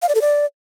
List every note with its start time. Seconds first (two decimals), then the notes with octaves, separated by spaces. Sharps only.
0.02 F5
0.09 D5
0.15 A4
0.21 D5